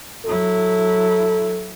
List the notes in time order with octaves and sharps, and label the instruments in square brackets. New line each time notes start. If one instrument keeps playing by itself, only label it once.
[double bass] F#3 E4 [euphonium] A4